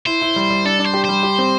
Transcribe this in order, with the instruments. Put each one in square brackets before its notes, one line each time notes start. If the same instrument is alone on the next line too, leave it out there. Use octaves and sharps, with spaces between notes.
[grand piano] E4 [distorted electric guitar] C5
[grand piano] E4
G3
G3
[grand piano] D4 [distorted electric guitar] A4
[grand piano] D4
[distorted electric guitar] C5
[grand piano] G4
[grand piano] G3 [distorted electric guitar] C5
[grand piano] G4
C4